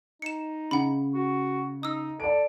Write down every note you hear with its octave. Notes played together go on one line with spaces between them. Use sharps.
D#4 C#7 E7
C#3 F#5 B5
F#4
D#4 D#6 E6
A4 D5 D7